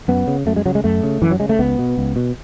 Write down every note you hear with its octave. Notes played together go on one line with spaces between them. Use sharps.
F#2 B3
C#3
F#2 A3
G#3
C#3 F#3
G#3
F#2 A3
C#3
F#2 E3
F#3
C#3 G#3
A3
C#2 B3
B2
C#2
B2